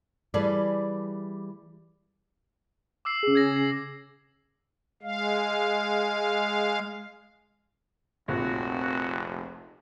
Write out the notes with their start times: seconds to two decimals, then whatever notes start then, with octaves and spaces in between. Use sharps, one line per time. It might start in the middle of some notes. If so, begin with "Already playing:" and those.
0.34 E3 G3 G#4 A4 B4 D5
3.05 D6 E6 C7
3.23 C#3 G#4
3.35 G#6 A#6
3.56 C7
5.03 G#3 F5
8.28 F1 A#1 D#2 C4 F#4